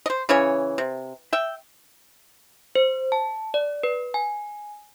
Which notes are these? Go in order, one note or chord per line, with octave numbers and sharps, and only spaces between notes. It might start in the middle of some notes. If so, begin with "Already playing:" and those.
C5 D#5
C#3 E3 C#4 C#5
C3
E5 G5
C5
A5
D5
B4
G#5